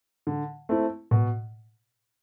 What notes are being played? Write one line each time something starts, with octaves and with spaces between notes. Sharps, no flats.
D3
A3 C4 E4
B2